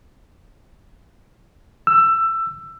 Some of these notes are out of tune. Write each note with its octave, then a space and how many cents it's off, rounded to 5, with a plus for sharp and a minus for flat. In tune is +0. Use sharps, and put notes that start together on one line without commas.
E6 +15